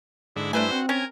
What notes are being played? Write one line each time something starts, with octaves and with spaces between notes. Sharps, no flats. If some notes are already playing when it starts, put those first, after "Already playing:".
G#2 D3 E4
G2 A3 D4 E4 B4 C5 G#5
C4 F#4
C#4 A#4 G#5